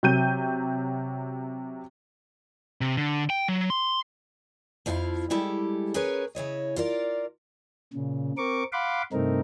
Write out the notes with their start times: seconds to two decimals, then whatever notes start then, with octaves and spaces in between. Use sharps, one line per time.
0.03 C3 F#3 G6 D#7
2.81 C3
2.97 D3
3.30 G5
3.48 F#3
3.70 C6
4.86 F2 F3 E4 G4 F5
5.30 G3 G#3 E4 G4 A4
5.94 C#4 G#4 A#4 B4 C#5
6.35 C#3 E4 C#5 D#5
6.76 F4 A#4 D5
7.93 A#2 C#3
8.38 C4 A#4 C#6 D6
8.72 F5 F#5 B5 C6 D6
9.13 G2 C3 A3 C4 D#4 A#4